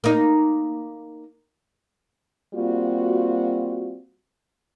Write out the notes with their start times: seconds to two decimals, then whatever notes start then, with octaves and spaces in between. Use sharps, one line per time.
0.04 A#3 D#4
2.55 G3 A#3 C4 F4 F#4